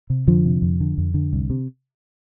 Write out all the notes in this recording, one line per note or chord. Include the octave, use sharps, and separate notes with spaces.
C3
F2 D3 F3
C3
F2
D3
F2
D3
C2
C3